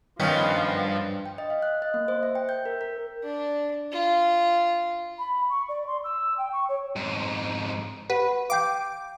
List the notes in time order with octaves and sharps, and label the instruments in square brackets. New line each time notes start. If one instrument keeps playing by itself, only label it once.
[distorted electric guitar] G2 [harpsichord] D#3 C#4 [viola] F3 [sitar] B3 F4
[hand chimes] G5
D#5
F5
F#6
D#5
A#3
C5
E5
G5
G6
A#4
A#4
[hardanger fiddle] D4
F4
[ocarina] B5
C#6
D5
C6
E6
G5
C#6
C#5
[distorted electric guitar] F2 G#2
[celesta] G4 F#5 D#7 [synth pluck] B4
[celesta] F5 G5 G6 [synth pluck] D6